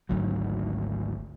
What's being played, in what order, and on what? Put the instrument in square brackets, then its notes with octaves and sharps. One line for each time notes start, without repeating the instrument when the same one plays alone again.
[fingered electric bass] G#1 D2 F#3